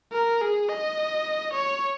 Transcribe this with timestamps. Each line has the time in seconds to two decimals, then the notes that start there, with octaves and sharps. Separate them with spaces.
0.12 A#4
0.41 G#4
0.69 D#5
1.53 C#5